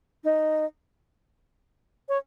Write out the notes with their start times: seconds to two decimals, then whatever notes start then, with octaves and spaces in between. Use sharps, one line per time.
0.24 D#4
2.09 C#5